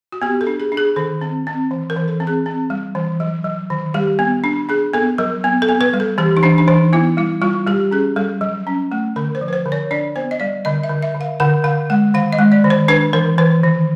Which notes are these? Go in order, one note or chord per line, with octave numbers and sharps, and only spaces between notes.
F#4
B3 G4
A4
D4
G#4
D4
G#4
D#3 A4
C4
C4
E3
A#4
E3
A4
C4
G#4
C4
G3
E3
F#3
F#3
D#3
G3 G4
B3
D4
D4 G#4
B3 A4
F#3 A#4
B3
A4
B3
B4
G3
A4
E3 G4
D#4
E3 D4
D4
E3 D#4
B3 E4
G3 E4
G3 F4
G3 G4
C#4 G#4
G3 A4
F#3
C#4
A3
D3 A#4
C5
F3
B4
C5
D3
C#5
D4 D5
B3 C5
D#5
G3 D5
D3 D#5
E5
D3
E5
D3
F5
D3 F#5
D3 F5
G#3 F#5
D#3 F5
D#5
G#3
D5
D#3
C5
D4 B4
E3 A#4
E3 B4
D#3